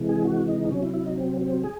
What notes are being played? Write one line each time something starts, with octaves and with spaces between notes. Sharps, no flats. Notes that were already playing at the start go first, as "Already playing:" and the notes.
Already playing: C3 E3 G#3
G#4
F#4
D#4
C3 F#3 C#4
E4
E4
D#4
C4
C4
G#4